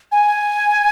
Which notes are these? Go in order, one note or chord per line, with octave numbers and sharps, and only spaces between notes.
G#5